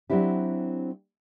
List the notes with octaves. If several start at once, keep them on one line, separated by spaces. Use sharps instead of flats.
F#3 C4 D4 E4 G4